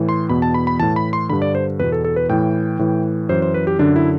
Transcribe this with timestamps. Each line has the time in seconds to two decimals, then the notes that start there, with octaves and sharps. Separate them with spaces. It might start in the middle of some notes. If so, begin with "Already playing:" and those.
Already playing: A2 E3
0.09 C6
0.29 E2 B2 B5
0.42 A5
0.54 B5
0.67 B5
0.79 A2 E3 A5
0.96 B5
1.13 C6
1.29 G2 D3 B5
1.42 D5
1.55 C5
1.80 E2 B2 B4
1.92 A4
2.05 A4
2.16 B4
2.29 A2 E3 G5
2.79 A2 E3
3.29 F#2 E3 C5
3.42 C5
3.54 B4
3.67 G4
3.79 F#2 D3 D4
3.96 E4